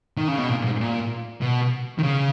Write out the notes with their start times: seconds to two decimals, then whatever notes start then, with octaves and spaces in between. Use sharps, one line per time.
0.18 D#3
0.28 C#3
0.39 B2
0.50 A#2
0.66 G#2
0.80 A#2
1.42 B2
1.99 D#3
2.04 C#3